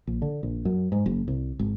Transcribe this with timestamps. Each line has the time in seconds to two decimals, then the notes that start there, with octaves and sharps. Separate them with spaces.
0.07 A#1
0.22 D3
0.43 A#1
0.65 F#2
0.92 G#2
1.06 F#1
1.28 C2
1.59 G#1